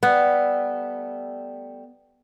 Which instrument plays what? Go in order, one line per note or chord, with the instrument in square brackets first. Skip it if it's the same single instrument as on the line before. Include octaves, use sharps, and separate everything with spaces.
[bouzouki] G3 A3 [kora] B3